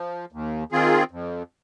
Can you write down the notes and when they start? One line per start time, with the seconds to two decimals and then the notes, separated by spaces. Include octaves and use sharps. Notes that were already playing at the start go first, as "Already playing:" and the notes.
Already playing: F3
0.32 D#2
0.72 D#3 C4 F4 G#4
1.11 F2